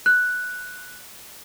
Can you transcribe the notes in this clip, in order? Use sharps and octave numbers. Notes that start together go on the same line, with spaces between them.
F#6